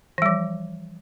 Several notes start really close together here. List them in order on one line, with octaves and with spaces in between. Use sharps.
E3 G3 F3